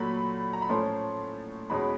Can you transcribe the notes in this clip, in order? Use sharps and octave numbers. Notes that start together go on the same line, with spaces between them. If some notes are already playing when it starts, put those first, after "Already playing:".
Already playing: A#2 F#3 A3 B5
A#5
B5
A2 F3 A3 C#4 C6
E2 B2 G#3 C#4 B5